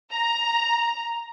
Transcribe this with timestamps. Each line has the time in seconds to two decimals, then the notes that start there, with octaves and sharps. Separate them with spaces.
0.11 A#5